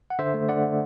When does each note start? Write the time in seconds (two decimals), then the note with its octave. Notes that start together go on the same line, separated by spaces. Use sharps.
0.10 F#5
0.19 D3 C5 E5
0.34 A3
0.49 D3 D5 F#5